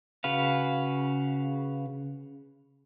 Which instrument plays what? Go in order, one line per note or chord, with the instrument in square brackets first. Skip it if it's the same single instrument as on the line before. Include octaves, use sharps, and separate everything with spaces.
[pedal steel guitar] C#3 F#4 B4 F5